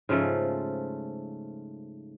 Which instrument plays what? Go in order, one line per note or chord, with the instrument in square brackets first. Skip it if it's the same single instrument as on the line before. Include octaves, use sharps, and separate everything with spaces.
[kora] G#2 C#3 F3 A3